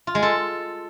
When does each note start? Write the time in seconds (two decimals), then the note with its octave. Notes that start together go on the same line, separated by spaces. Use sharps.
0.07 F4
0.15 G#3
0.22 A4